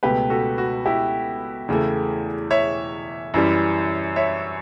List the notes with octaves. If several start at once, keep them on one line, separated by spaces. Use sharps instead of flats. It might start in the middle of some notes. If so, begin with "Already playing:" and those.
C#2 B2 A3 G4 B4
F#4 A4
F#4
E4 G4
E2 C#3 E3 A3
C#5 E5
F#2 E3 G3
C#5 E5